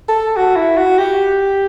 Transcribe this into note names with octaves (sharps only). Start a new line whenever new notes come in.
A4
F#4
E4
F#4
G4